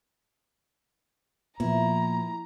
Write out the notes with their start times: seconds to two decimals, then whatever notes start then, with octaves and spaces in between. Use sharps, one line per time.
1.60 A#2 F3 B3 E4 A#5